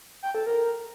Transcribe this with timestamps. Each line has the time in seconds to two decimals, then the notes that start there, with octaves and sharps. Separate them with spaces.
0.23 G5
0.35 A4
0.47 A#4